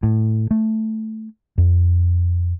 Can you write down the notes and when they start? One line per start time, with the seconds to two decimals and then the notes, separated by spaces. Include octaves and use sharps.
0.03 A2
0.51 A3
1.58 F2